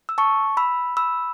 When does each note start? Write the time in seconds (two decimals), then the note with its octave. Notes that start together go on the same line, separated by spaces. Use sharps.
0.09 E6
0.18 A5 C#6
0.57 B5 E6
0.97 B5 E6